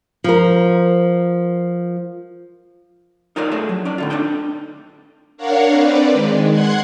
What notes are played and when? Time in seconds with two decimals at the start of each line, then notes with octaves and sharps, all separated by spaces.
0.24 F3 A#4
3.36 D#4 F4 A#4 C#5 D5 F5
3.52 A3 G#4 C#5 E5
3.69 F#3
3.85 C#4 D5
3.98 A2 D3 F4
4.10 C4 D4 D#4 A4 G5
5.37 D4 A#4 C#5 F5 F#5
5.72 C4 B4 D5
6.13 D#3 G#3
6.51 F#5 C6 F#6 G#6